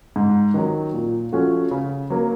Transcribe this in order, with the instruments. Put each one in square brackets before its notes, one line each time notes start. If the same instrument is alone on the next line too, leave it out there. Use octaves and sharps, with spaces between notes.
[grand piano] G#2
D#3 F#3
A#2
F3 A3 C#4 F#4
C#3
F#3 A#3